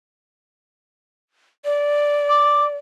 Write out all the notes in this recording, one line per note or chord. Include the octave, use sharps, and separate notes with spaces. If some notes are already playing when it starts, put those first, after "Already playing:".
D5
D6